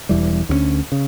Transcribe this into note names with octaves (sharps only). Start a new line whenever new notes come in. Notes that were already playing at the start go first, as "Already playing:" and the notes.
E1 E2 E3 G3
D2 D3 F3 C#4
C#3